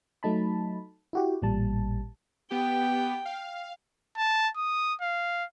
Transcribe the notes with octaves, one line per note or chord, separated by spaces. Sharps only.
F#3 A3 D#4 A5 B5
E4 F#4 G4
A1 A#2 G3 A5
B3 G4 G5
F5
A5
D#6
F5